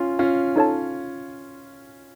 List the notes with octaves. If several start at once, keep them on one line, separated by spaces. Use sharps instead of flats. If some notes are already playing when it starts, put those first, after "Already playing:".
Already playing: C#4 F4
C#4 F4
D#4 A4 C#5 A5